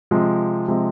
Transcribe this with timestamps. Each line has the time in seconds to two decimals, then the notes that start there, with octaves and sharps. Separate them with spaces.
0.11 C3 F3 G#3
0.68 C3 F3 G#3